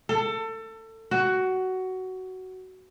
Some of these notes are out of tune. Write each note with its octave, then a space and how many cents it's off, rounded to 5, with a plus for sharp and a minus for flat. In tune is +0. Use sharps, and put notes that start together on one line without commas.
A4 +25
F#4 +15